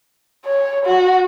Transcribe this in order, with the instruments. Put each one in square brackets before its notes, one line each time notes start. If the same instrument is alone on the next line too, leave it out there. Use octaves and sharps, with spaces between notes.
[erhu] C#5
F#4